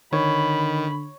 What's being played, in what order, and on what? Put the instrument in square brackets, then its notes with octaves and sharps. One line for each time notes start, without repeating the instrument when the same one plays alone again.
[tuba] D3 [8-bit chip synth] D#3 [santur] C#5 [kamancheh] B5